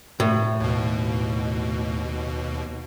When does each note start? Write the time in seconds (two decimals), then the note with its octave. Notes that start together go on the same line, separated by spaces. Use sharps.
0.20 A2
0.60 D#2 B2